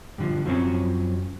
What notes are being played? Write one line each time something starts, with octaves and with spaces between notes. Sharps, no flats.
G2 D3 F3
F#2 F3 F#3 A#3 C4 C#4